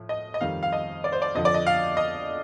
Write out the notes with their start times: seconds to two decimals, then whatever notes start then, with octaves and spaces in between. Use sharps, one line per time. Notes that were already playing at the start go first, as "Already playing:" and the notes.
Already playing: A2 F3
0.09 D#5
0.34 D#5
0.41 F2 D#3 G3 F5
0.63 F5
0.73 D#5
1.04 D5
1.12 C5
1.22 D5
1.35 F2 D3 F3 D#5
1.45 D5
1.54 D#5
1.67 F5
1.97 D#5